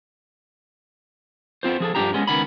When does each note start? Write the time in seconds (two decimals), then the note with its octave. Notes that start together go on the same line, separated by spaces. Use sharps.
1.63 B3 C4 F4 C5
1.80 F3 G#4 A4
1.95 G2 C#3 F3 D4 G4 A#5
2.14 G#3 B3 C#4
2.28 C#2 D#3 B3 C#4 B5